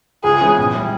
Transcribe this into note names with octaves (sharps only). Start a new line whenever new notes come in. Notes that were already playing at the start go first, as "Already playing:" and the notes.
C#2 G#4
C#3 E3 G#3 B3
A#1
E3 G3